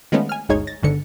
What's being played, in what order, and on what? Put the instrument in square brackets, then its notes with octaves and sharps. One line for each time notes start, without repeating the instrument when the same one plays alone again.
[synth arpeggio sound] D#3 F3 G#3 A3 B3 C#4
G#5 F6
G1 D2 G#3 D#4 C#5 G#6
A6 A#6
G1 G#2 D3 C#7